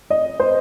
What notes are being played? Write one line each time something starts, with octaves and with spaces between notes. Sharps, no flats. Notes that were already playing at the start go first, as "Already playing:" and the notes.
D#5
C5